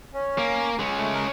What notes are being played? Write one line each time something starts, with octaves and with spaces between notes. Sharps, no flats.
C#4
A#3
G#3 C#4
A3
A#4